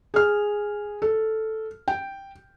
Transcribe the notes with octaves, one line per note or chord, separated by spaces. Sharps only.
G#4 F6
A4
G5